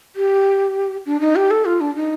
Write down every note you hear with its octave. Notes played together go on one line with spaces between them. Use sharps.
G4
D4
D#4
G4
A4
F4
D4
D#4